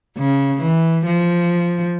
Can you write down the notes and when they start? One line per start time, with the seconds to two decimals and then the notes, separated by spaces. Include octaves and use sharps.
0.18 C#3
0.62 E3
1.06 F3